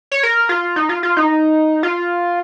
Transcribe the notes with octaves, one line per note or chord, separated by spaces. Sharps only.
C#5
A#4
F4
D#4
F4
F4
D#4
F4